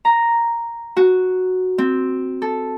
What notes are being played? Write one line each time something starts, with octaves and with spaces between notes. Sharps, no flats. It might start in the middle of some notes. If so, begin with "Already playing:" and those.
A#5
F#4
C4
A4